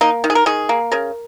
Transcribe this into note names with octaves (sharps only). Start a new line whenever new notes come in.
A#3 D#4
D#3
G#4
A#4
D#3 G#4
A#3
C#3 A#4